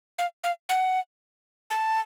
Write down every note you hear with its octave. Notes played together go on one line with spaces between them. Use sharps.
F5
F5
F#5
A5